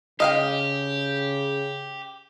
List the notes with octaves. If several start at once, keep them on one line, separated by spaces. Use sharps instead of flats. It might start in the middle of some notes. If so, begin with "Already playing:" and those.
C#3 G4 D#5 F5 G5